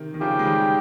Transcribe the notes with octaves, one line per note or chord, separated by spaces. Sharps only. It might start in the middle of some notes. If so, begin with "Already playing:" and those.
Already playing: C3 D#3
D#3
C#3 F3 G4
G#3
D#3 G3